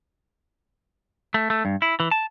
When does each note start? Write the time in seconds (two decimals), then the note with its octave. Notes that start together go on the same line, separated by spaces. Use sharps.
1.34 A3
1.50 A3
1.65 G2
1.82 E4
2.00 E3
2.11 A5